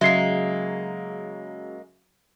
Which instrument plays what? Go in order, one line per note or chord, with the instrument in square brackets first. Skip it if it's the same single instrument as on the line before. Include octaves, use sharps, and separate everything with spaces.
[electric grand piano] C#3 F#3 [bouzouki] G#3 A#3 [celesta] E5 C7